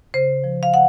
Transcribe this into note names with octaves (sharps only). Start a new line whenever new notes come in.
C#3 C5
F3
F5
F#5